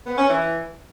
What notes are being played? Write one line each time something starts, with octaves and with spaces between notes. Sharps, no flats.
B3
C#4
E3